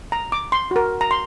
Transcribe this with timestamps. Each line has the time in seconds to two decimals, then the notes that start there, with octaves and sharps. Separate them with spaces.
0.12 A#5
0.32 D6
0.52 C6
0.71 F#4 A#4
1.01 A#5
1.11 C6